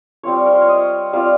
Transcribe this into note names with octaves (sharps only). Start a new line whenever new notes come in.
G3 C4 F4 C#5
A#4
C5
C#5
D#5
G3 C4 F4 F5